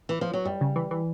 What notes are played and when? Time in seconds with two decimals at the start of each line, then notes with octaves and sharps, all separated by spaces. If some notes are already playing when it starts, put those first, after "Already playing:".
0.09 E3
0.21 F3
0.33 F#3
0.45 F#2 G3
0.61 C#3
0.76 E3
0.91 E3